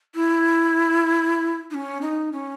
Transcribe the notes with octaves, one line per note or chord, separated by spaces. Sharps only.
E4
D#4
C#4
D#4
C#4